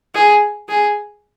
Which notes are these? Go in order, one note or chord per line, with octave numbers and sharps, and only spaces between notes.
G#4
G#4